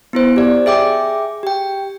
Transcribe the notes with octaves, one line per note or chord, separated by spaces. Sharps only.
B3 E4 C5
G4 D5
G#4 E5 G5 D6
G4 G5